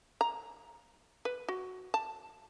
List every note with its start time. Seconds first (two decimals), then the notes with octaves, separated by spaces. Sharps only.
0.21 A#5
1.25 B4
1.48 F#4
1.94 A5